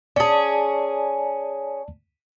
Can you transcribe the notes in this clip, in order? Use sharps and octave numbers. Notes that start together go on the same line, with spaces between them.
C#4 G#4 D5 A5